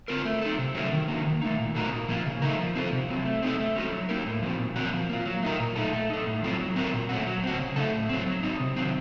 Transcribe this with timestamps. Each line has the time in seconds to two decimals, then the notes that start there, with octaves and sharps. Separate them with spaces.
0.08 C4 F4 A#4
0.25 A3
0.41 D#4 A4
0.58 C3
0.75 F#3 A3 C#4
0.92 D#3
1.08 A#3 D#4 F#4
1.25 D#3
1.42 A3 D#4
1.58 A#2
1.75 A3 D#4 F#4 A#4
1.92 A#2
2.09 F3 A#3
2.26 C#3
2.42 A3 D#4 A#4
2.59 F3
2.75 C4 F4 A4
2.92 C3
3.09 F#3 C4
3.25 A3
3.43 C4 D#4 A4
3.59 A3
3.76 C#4 F#4 A4
3.92 F#3
4.09 A#3 D#4 A#4
4.26 A2
4.43 F3 C4 F#4
4.59 A#2
4.76 F#3 C4 F#4 A#4
4.93 F3
5.10 A#3 F4
5.26 F#3
5.43 A3 D#4 A#4
5.60 A#2
5.76 A3 D#4 A4
5.93 A3
6.10 D#4 A4
6.26 A2
6.43 F#3 C4 F4 A4
6.59 F#3
6.76 C4 F#4 A#4
6.93 A#2
7.09 A3 C#4 F#4
7.27 F#3
7.44 C4 F#4
7.60 C#3
7.76 A3 D#4 A4
7.94 A2
8.09 F#3 C4
8.26 F#3
8.43 C4 D#4
8.60 C3
8.77 D#3 F#3 C4